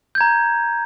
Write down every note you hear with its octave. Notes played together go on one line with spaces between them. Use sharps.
A#5 G6 G#6